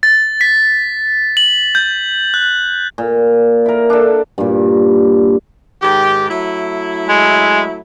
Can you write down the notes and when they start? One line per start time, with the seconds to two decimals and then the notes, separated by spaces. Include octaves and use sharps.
0.03 A6
0.41 B6
1.37 F#7
1.75 G6
2.34 F#6
2.98 A#2
3.66 E4 A#4
3.90 D4 A4
4.38 G2 A#2
5.82 G#2 D#3 G4
6.30 F#3 A3 E4
7.09 G#3